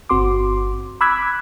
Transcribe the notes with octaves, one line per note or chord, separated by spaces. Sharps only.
G1 C4 F#4 C6 D6
B5 D6 E6 F#6 G#6 B6